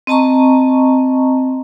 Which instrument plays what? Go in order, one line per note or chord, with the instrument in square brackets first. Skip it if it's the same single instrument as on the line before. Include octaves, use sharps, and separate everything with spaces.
[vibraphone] C4 D#5 A5 A#5 C#6